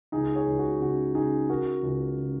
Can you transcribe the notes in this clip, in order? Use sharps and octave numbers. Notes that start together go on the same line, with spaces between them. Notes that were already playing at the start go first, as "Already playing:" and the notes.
C#2 D#4 G#4
G#4 C#5
C#2
F#4
C#3 F#4
C#3 D#4 G#4
C#3 F#4 A#4
C#2
C#3